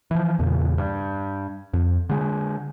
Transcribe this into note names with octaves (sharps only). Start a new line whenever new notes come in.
E3 F3
E2 A#2 C#3
G2
F2
D3 G#3